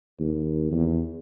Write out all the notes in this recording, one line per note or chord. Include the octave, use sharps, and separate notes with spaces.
D#2
E2